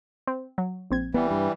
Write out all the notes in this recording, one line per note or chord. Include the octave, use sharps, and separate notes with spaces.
C4
F#3
A#1 C4 G#6
E3 G3 B3
G2